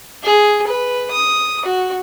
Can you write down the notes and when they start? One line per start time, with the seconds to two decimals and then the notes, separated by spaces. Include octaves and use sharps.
0.23 G#4
0.67 B4
1.11 D#6
1.65 F#4